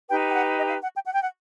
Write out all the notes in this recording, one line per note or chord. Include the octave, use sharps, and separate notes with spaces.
D#4 G4 B4 G5
G5
F#5
D#5
F5
F#5
G5
F#5
G5
F#5